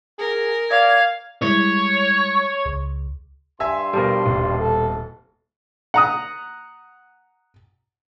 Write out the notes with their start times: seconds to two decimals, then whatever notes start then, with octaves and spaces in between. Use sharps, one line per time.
0.19 G#4 A#4
0.71 D5 F5 G#6
1.42 G3 G#3 E4 C#5
2.65 C#2
3.60 G2 E5 G#5 C6 E6
3.93 B2 F3 G3 A4 A#4
4.26 D#1
4.59 A4
5.94 F#5 A#5 D#6